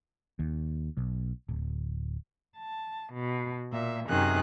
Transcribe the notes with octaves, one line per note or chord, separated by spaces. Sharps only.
D#2
B1
D1
A5
B2
A#2 E5
F#2 C3 D#3 G#4 F#6